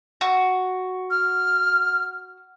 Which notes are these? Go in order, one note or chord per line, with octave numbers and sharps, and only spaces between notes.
F#4
F6